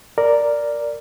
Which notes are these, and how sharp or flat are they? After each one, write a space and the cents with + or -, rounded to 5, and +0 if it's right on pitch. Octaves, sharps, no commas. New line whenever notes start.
A#4 +0 D5 +0